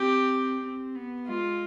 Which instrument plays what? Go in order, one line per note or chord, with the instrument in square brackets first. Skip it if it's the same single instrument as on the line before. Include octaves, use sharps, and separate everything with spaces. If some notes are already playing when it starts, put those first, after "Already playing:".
Already playing: [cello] C4 [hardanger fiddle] G4
[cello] C4
B3
[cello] G#3 [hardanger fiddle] F4